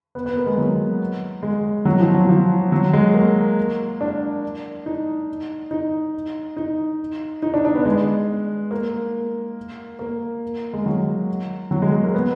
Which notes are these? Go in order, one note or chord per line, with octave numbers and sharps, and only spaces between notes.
B3
B3
A#3
G#3
F#3
G#3
F#3
F3
F#3
F3
F#3
G#3
A#3
D4
D#4
D#4
D#4
D#4
D4
D4
B3
G#3
A#3
A#3
G#3
F#3
F#3
G#3
G#3
A#3
B3